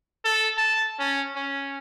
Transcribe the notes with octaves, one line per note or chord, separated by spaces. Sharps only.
A4
A5
C#4
C#4